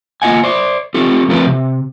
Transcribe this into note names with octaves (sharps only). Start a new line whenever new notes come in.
A#3 F4 D#5 F#5 G#5
C5 D5
C4 F4 G4 A4
F3 A3 C4 F4 A#4 B4
C3